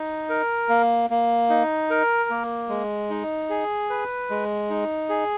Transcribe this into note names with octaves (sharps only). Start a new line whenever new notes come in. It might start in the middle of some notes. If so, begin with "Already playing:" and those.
Already playing: D#4
A#4
A#3
A#3
D#4
A#4
A#3
G#3
D#4
G#4
B4
G#3
D#4
G#4